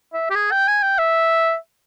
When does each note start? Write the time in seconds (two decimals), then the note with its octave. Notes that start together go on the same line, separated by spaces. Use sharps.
0.14 E5
0.30 G4
0.35 G#4
0.51 G5
0.68 G#5
0.83 G5
0.99 E5